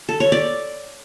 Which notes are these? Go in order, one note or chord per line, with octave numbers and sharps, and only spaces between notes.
A4
C#5
D5